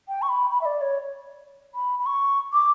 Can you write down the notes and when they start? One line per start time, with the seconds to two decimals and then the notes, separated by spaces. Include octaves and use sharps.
0.08 G5
0.22 C#6
0.29 B5
0.50 B5
0.61 E5
0.65 D5
0.81 C#5
1.75 B5
2.00 B5
2.06 C#6
2.53 D6